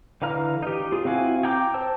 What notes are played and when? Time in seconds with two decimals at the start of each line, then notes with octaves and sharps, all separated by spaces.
0.22 D3 E3 F5 A#5 F6
0.63 D#4 G4
0.92 F4 G#4
1.05 C4 E4 F#4 F5 G#5
1.43 G#4 G5 A#5 D6 G6
1.74 C5 A5 E6